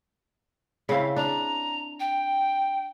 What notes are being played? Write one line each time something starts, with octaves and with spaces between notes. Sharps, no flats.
C#3 C4 E4 F5
D4 A#5
G5